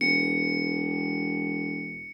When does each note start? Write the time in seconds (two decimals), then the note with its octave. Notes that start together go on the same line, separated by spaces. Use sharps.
0.01 E1 C#7